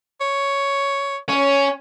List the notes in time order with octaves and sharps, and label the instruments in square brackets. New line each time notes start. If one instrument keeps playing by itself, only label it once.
[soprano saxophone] C#5
[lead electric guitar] C#4 [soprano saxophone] C#5